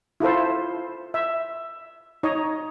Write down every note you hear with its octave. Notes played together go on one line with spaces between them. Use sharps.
E4 F4 A4 C5
E5
D#4 C#5 D#5